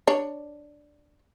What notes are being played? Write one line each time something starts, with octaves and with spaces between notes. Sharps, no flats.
D4 C#5